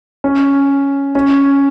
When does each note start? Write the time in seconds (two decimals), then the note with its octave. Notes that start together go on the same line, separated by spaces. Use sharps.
0.24 C#4
1.15 C#4